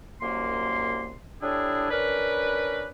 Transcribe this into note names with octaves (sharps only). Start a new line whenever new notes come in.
C2 F#2 A#3 C6
A2 G3 D4 E4 G#4
C#4 D4 A#4 B4